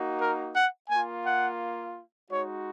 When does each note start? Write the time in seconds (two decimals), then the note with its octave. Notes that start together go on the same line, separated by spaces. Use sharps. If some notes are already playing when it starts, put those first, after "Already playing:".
Already playing: A#3 D#4 F#4
0.20 A#4
0.55 F#5
0.90 A#3 F4 G#5
1.25 F#5
2.30 G#3 D#4 F#4 C#5